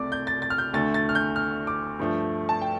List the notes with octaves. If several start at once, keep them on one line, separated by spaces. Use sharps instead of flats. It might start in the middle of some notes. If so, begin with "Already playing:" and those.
Already playing: C2 C3 A3 D5 D6
G6
A6
A6
F6
G6
D2 D3 A3 A6
A6
F6
G6
F6
D6
G2 F3 A3
A5
G5